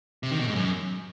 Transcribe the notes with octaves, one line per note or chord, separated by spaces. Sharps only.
C3
D#3
B2
G#2
F#2